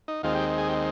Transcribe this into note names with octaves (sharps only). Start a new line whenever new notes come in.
D#4
D#2 D#3 G#3 C4 F4
G4
G#4
G4